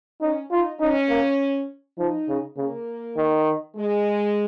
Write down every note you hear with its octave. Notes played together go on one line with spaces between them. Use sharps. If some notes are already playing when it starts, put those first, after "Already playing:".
C#4 D#4
D#4 F4
C#4 D#4
A#3
F3 D#4
C#3
C#3 A#3
D#3
G#3